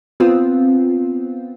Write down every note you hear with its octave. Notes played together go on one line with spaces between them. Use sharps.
B3 C4 F4